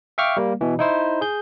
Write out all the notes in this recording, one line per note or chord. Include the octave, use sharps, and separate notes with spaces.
E5 F5 G5 C#6 D6 F6
G3 A#3
B2 E3
D#4 E4 C5
G#4 G6